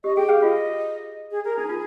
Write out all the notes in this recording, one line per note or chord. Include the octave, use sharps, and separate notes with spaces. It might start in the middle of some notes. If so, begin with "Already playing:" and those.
G4 D#5
G#4 G5
G#4 F5
F4 D#5
G#4
A#4
D#4 G#4
F4